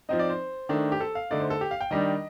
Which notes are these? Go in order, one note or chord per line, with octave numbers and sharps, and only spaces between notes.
F3 C4 D#4 D#5
D5
C5
D#3 A3 D4
G4
A4
F5
D3 A3 D#4 D5
C5
A4
G4
F5
G5
D#3 G3 D4 D#5